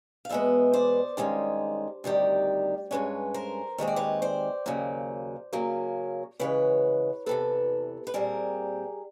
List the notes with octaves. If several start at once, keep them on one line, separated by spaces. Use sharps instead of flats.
F5
E2 B2 G#3 B3 E5
C5 D5
G2 D#3 G#3 C#4
D2 C3 D#3 G3
G2 D#3 G#3 C#4 B4 C#5
A#4 C5
D#2 D#3 G#3 C4 C#5
D5
B4 C#5
C5 D5
D#2 C#3 F#3 A#3
C#3 F#3 A#3 C#4
C#3 E3 G#3 B4 C#5
E2 C3 E3 A4 B4
B4
A#2 G3 C4 G#4 A#4